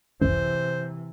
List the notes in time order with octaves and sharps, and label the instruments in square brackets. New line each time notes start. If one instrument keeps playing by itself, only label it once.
[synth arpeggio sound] G#1 C#2 F#2 [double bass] C3 E3 [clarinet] C5